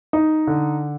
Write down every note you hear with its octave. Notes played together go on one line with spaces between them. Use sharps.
D#4
D3